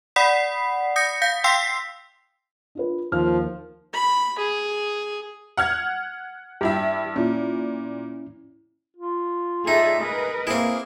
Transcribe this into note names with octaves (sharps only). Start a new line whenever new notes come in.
D5 F#5 B5 D#6 B6 C7
D#6 G6 A#6 C#7
F5 G6 B6
F5 G5 C6 E6 B6 C7
D4 F4 B4
D#2 F3 F6
B5
G#4
F#5 F6 G#6
G2 E4 G4 E5 G5
A#2 C#4 E4
F4
A3 D#4 G#4 A4 D5 E5
G#4 A#4 B4 D#5
A#3 C4 E4 G#4